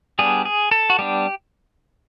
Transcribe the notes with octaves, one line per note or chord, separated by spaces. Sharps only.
G3 B3 D4 G#4
G#4
A4
F#4
G3 B3 D4 G4